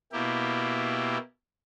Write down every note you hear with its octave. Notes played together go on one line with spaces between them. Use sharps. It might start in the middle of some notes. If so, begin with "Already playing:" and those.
B2 A#3 E4 G4